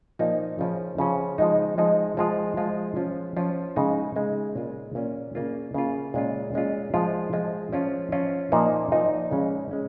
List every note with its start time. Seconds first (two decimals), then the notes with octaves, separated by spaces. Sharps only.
0.19 A#2 F3 A#3 D#4
0.59 C#3 F3 C#4
0.98 C#3 F3 C#4
1.38 F3 G#3 D#4
1.78 F3 G#3 D#4
2.17 F3 G#3 F4
2.57 F3 G#3 F4
2.96 F3 C#4 F4
3.37 F3 C#4 F4
3.76 C#3 G#3 D#4
4.16 C#3 G#3 D#4
4.55 A#2 A#3 C#4 F4
4.95 A#2 A#3 C#4 F4
5.35 C#3 A#3 F4
5.74 C#3 A#3 F4
6.14 A#2 G#3 C#4 F4
6.54 A#2 G#3 C#4 F4
6.94 F3 G#3 F4
7.33 F3 G#3 F4
7.73 F3 C#4 F4
8.12 F3 C#4 F4
8.52 A#2 F3 A#3 D#4
8.92 A#2 F3 A#3 D#4
9.31 C#3 G#3 C#4
9.71 G#3 C#4